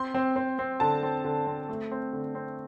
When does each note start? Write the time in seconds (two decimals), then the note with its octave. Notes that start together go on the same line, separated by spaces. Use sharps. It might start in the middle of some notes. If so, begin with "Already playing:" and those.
Already playing: C4 C6
0.14 C4
0.36 C4
0.59 C4
0.80 D3 A5
1.03 C4
1.24 D3
1.47 C4
1.69 A3
1.91 C4
2.13 D3
2.35 C4